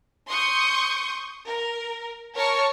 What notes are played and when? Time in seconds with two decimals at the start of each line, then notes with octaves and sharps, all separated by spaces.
0.28 C6 C#6 D#6 G6 C#7
1.46 A#4
2.35 A#4 C#5 A5 C#6 F6